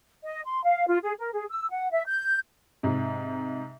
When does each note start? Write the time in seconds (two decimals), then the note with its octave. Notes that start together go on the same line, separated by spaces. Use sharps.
0.24 D#5
0.45 C6
0.64 F5
0.87 F4
1.03 G#4
1.19 A#4
1.33 G#4
1.49 E6
1.69 F#5
1.91 E5
2.06 G6
2.83 G#2 C3